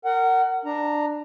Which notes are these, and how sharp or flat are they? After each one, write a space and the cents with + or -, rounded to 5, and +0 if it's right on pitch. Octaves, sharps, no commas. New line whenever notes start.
A#4 -20 F#5 +20
D4 +15 A#5 +0